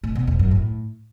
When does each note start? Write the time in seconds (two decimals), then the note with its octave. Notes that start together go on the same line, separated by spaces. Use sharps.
0.03 A2
0.15 B2
0.27 E2
0.39 F#2
0.51 A2